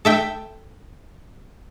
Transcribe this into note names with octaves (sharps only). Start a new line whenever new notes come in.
A4 E5 G5